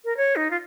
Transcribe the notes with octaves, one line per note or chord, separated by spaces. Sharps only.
A#4
C#5
D#4
F4